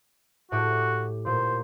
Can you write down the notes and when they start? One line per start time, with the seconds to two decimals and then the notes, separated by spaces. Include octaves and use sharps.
0.52 A2 F#4 G4
1.26 A#2 C5